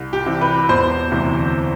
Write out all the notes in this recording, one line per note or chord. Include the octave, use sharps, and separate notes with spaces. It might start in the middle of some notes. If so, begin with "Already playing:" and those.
Already playing: C2
G4
C3 E3
B4
E1 C5
D2 C3 E3